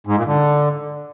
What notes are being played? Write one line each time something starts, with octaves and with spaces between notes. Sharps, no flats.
G#2
A#2
D3